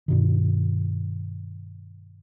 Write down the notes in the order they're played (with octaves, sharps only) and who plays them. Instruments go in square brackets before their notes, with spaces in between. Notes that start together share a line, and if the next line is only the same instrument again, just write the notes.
[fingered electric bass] G2 B2 D#3